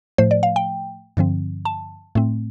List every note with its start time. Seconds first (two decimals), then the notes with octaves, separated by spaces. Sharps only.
0.18 A2 F3 A3 C5
0.31 D5
0.43 F5
0.56 G5
1.17 G2 D3 F3 C4
1.65 A5
2.15 A2 A3 C4